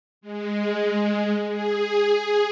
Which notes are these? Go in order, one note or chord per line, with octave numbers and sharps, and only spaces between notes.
G#3
G#4